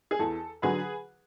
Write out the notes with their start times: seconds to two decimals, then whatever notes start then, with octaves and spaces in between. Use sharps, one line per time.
0.11 G#4
0.19 E2 A4
0.62 D3 F#3 G#4 B4